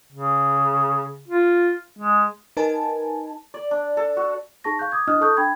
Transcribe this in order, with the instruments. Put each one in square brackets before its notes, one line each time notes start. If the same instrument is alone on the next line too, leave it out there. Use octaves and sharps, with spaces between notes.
[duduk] C#3
F4
G#3
[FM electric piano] D#4 A#4 B4 G#5 A5
[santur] D5
D4
A4
F#4
[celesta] D#4 G#4 A5 C#6 A#6
F5 C#6 F#6 G6
D6 D#6 G#6
D4 E4 D#5 D#6 F6 F#6
A4 A5 C#6 D#6 F#6 G6
D4 G5 B5 G#6